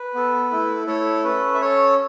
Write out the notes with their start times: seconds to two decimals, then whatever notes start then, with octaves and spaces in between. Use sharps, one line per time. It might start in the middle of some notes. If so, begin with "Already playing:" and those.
Already playing: B4
0.14 B3 A4
0.51 A3 E4 A4
0.87 A3 E4 A4 C#5
1.24 C#4 A4 B4
1.54 E5
1.61 C#4 A4 C#5